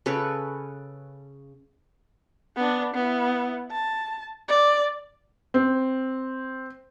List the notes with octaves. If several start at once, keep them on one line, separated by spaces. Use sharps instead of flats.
C#3 A4 B4 C#5
B3 D4
B3 E4
A5
D5
C4